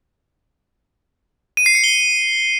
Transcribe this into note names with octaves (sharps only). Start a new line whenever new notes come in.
D#7
C7
C#7
G7